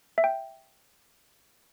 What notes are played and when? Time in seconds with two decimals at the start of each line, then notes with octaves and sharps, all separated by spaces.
0.18 E5
0.24 G5